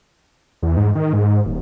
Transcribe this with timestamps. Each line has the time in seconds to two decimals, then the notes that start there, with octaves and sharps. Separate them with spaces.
0.62 E2
0.77 G#2
0.95 D#3
1.13 G#2
1.46 D#1